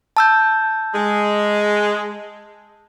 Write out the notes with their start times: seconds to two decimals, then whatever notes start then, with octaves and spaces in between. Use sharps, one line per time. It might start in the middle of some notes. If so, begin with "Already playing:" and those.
0.17 A5 E6 G6
0.94 G#3